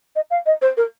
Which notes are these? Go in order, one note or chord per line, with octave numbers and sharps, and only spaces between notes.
D#5
F5
D#5
C5
A#4